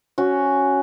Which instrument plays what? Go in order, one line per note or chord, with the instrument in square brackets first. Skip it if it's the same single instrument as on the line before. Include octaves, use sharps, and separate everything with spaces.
[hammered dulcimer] C#4 F#4